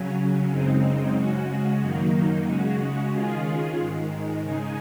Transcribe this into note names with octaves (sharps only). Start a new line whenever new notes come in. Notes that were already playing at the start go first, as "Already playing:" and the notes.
Already playing: C#3 F#3 C#4
F#2 C#3 G#3 C4 D#4
C#3 G#3 C#4 F#4
F#2 D#3 F#3 A#3 D#4
C#3 G#3 C#4 F#4
D#3 G#3 C#4 F4 G#4
G#2 D#3 G#3
C#3 G#3 D#4 G#4